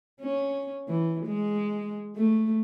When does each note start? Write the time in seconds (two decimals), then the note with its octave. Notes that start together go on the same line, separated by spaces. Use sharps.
0.21 C#4
0.89 E3
1.26 G#3
2.16 A3